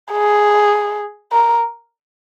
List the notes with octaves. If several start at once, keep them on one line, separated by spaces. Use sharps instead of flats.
G#4
A#4